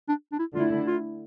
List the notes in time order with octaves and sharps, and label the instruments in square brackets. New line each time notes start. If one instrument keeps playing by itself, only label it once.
[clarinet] D4
D4
E4
[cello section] D3 A3 E4 [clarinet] F4
[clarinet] F4